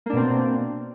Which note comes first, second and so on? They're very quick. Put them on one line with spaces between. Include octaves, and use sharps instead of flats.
A#3 D4 B2 C4